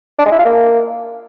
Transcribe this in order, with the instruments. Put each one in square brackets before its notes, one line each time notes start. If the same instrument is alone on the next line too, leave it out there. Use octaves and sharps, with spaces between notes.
[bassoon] D4
G#3
E4
F4
A#3